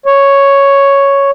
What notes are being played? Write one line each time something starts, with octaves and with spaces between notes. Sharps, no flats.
C#5